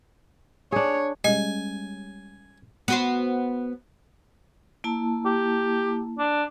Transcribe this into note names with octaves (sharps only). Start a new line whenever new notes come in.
D4 G#4 C#5
G3 G#3 C#4 D#5 G#5
B3 F#4 C5
A#3 E4 A5
G4
D4